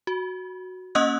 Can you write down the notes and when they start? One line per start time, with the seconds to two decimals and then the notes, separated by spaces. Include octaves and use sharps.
0.07 F#4
0.95 A#3 C#4 D#5 D#6 E6 F#6